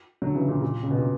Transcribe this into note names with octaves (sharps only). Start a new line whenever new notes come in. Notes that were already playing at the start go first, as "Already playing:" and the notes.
D3 F#3
C#3 E3
A#2 C#3
A#2
C#3
B2
A#2